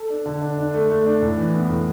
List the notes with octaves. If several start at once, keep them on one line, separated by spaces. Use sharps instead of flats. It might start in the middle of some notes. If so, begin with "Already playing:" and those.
Already playing: A4
D4
D3
D4
D4
A3
A3
D4
A2
E3
B3
A2